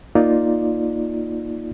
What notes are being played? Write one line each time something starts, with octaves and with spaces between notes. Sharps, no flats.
A#3 D#4 F4 D5